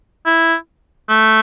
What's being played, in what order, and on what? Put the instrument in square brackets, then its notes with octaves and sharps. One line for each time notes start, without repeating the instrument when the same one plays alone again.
[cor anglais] E4
A3